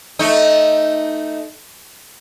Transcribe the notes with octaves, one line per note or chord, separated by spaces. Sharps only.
A3 D#4